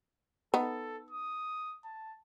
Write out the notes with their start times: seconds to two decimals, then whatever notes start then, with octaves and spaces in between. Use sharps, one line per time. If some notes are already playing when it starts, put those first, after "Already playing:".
0.54 B3 D#4 A4
1.10 D#6
1.85 A5